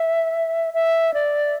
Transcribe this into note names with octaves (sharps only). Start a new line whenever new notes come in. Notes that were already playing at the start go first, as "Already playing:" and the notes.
Already playing: E5
E5
D5